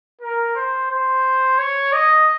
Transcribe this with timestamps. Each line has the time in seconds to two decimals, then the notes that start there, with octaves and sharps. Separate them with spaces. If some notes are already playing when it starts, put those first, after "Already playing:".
0.22 A#4
0.56 C5
0.90 C5
1.59 C#5
1.93 D#5